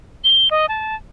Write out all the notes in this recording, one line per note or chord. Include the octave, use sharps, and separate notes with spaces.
G7
D#5
A5